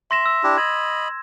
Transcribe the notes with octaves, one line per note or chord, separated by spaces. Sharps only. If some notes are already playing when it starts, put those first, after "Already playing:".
E5 C6 A#6 E7
E6
D4 E4 G4
D#5 B5 G#6